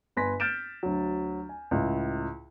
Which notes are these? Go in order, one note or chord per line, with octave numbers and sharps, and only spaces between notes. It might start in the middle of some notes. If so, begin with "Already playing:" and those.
G1 B4 G#5 C6 A#6 B6
F6 G6 A6 D7 E7
D2 F#3
G#5
C#2 A2